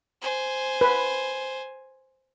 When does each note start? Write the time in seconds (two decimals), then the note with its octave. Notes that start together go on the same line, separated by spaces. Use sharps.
0.22 C5 G#5
0.81 B4